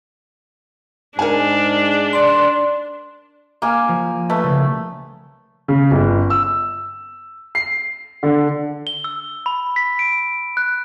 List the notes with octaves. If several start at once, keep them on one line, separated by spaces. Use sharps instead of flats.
G#2 D4 A#4 G#5
D5 C6
A#3 G#5 D6 F6
F3
A3 B4 A5
C2 C#3
C#3
G1
E6
C7
D3
G7
E6
B5
B6
D7
F#6